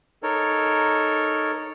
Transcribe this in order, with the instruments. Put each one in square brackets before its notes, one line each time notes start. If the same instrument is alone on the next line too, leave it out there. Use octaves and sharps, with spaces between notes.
[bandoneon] D#4 A4 A#4 C#5